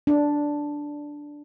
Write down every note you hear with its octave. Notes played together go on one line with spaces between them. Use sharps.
D4